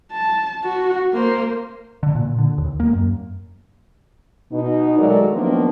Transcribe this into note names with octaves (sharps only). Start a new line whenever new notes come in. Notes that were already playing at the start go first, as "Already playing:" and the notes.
A5
F#4
A#3 C5
D3
A#2
D3
D#2
A#3
F#2
B2 D#4
D#3 F#3 G#3 A3 A#4 D5
D#3 F3 F#3 A#3 B3 D4